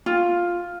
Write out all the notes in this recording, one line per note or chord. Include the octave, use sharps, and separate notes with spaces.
F4